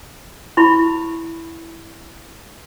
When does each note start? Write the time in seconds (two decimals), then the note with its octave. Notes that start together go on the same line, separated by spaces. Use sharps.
0.57 E4 B5 C#6